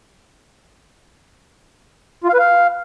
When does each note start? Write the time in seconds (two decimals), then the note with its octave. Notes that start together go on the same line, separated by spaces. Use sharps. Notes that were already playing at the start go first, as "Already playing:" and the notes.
2.24 F4
2.29 F5
2.34 B4
2.39 F5